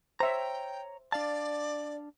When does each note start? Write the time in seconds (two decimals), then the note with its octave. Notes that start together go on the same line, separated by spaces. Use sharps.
0.20 C5 C#5 E5 G5 A#5
1.12 D4 D5 F5 A5